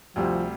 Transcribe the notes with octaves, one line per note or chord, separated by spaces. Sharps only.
D2 C3 F3 G3